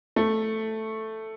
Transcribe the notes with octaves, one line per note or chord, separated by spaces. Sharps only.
A3